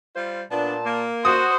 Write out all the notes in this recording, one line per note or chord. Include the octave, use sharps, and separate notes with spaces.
G3 F4 C5
A#2 B3 D4 A5
A#3
F#4 C5 D#6